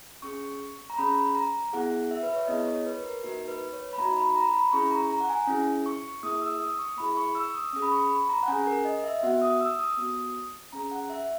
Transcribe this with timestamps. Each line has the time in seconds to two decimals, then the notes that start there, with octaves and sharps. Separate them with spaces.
0.22 C#4 G#4 C#6
0.90 A#5
0.98 C#4 G#4 B5
1.35 A#5
1.73 B3 E4 G#4 F#5
2.11 E5
2.23 B4
2.36 C#5
2.47 B3 E4 G#4 D#5
2.67 C#5
2.86 B4
3.04 A#4
3.23 A#3 D#4 F#4 A#4
3.48 B4
3.73 C#5
3.93 B5
3.98 A#3 D#4 F#4 A#5
4.17 B5
4.36 A#5
4.54 B5
4.73 C#4 E4 G#4 C#6
4.91 A#5
5.10 A#5
5.20 F#5
5.29 G#5
5.47 C#4 E4 G#4
5.86 C#6
6.23 A#3 E4 G#4 D#6
6.41 E6
6.61 D#6
6.79 C#6
6.97 A#3 E4 G#4 B5
7.17 C#6
7.35 E6
7.54 D#6
7.73 C#4 G#4 D#6
7.82 B5
7.92 C#6
8.10 B5
8.29 A#5
8.43 F#5
8.48 C#4 G#4 G#5
8.67 A#4
8.85 D#5
9.04 E5
9.19 E5
9.23 B3 F#4 F#5
9.42 D#6
9.61 E6
9.79 D#6
9.97 B3 F#4
10.72 C#4 G#4 A#5
10.92 F#5
11.10 E5